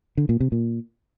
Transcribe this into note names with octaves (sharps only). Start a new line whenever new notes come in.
D3
A#2
C3
A#2